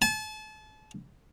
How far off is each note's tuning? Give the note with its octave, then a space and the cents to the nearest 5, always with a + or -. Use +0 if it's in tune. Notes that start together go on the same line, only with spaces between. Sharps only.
A5 -35